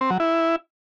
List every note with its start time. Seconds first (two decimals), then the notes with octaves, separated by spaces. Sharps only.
0.01 C4
0.10 F#3
0.20 E4